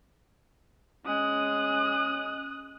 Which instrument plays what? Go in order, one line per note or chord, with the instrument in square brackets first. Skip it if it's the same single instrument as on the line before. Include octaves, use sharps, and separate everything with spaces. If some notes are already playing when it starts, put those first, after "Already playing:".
[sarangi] G#3 [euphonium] C#4 [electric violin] D#6 F#6